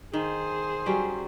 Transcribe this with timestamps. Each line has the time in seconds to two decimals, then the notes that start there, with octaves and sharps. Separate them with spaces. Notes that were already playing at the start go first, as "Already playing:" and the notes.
0.13 D#3 G#4 C5
0.86 F#3 G3 C#4